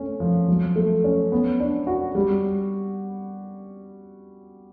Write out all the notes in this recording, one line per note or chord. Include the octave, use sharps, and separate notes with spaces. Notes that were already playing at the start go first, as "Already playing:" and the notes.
Already playing: A3 C#4
F3
F#3
A3
C#4
B3
D4
F#4
G3